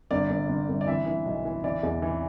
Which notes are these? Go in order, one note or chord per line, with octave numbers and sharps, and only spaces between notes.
G1 D5
G1
G1
G1
D5
E3 E5
E3
B1
E3
E3 D5
E2
E3